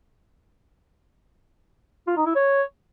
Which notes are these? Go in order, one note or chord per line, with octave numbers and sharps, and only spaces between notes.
F4
D#4
E4
C#5